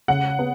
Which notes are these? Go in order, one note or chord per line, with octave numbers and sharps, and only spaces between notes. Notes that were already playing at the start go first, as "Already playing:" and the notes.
C#3 F#5
B3